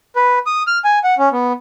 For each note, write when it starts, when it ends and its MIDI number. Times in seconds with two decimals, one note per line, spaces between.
0.16 0.39 71
0.47 0.63 87
0.67 0.78 89
0.85 0.99 80
1.04 1.14 78
1.18 1.29 61
1.32 1.53 59